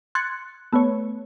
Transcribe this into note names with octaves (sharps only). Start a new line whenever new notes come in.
C6 F#6 G#6 A6 C#7
A3 B3 B4 C#5